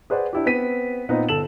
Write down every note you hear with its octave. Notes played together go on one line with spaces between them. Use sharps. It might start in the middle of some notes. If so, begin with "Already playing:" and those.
G#4 B4 C5 D5 F#5
D4 E4 G4
B3 C4 B6 D#7
A#2 B3 C4 D#4 B4
G1 A4 E7 F#7